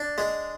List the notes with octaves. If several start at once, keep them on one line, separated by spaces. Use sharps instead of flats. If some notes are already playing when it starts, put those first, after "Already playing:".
Already playing: D4
G#3